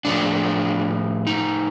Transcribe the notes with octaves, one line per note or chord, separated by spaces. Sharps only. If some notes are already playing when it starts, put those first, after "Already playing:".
A2 F3 D4
D#4